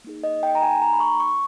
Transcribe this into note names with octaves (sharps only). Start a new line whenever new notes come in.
A#3 D#4 G#4
D#5
G5
A#5
G#5
A#5
B5
C#6
C#6